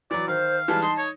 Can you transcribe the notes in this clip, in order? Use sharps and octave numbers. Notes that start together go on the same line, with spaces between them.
E3 F#3 D5
D#3 C5 F5
E3 G3 G#3 A5
D#4 C6
C#5